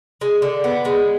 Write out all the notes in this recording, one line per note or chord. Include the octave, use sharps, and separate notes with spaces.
G#3
D3
B3
G#3